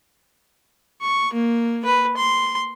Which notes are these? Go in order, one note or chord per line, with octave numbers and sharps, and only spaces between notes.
C#6
A#3
B4
C6